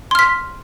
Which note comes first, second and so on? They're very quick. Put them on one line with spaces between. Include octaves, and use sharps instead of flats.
C6 F6 B6